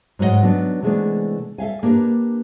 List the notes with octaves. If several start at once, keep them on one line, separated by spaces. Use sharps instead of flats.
G#2 F#3 A3 C#4 D#5 F#5
F#3 B3 D4 D#4
C3 E3 G#3 A3 B3 D4
A4 E5 F5 G#5
A#3 D4 G4 A#4 B4